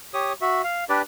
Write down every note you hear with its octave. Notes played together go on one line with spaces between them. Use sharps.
G4 C#5 D#6
F#4 E5
F5
D4 G4 B4 D5